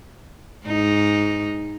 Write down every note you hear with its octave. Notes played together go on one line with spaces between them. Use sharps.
G#2 D#4